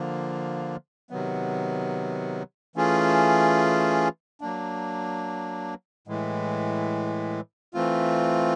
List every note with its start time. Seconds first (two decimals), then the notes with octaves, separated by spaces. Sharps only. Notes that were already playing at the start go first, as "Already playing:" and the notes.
Already playing: D3 F3 A#3
1.10 C3 D#3 F#3 B3
2.76 E3 A3 C#4 F4 G#4
4.41 F#3 A#3 D4
6.07 A2 E3 G#3
7.74 E3 A3 C4 F4